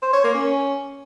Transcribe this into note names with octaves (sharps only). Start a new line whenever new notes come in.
C5
C#5
A#3
C#4